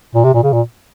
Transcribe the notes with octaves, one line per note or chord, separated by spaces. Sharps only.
A#2
C3
A#2
C#3
A#2